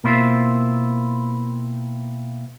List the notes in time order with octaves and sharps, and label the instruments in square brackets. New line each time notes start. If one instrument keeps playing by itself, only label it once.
[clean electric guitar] B2 A#3 C4 E4 F4 C5